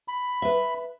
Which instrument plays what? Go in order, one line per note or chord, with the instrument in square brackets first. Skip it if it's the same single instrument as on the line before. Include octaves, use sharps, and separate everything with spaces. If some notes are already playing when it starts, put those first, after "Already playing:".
[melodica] B5
[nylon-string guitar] B4 E5